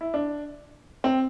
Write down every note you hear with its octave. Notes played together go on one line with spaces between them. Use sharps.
E4
D4
C4